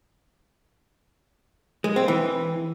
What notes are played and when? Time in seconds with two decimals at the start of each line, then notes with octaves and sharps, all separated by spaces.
1.84 G#3
1.96 C4
2.08 E3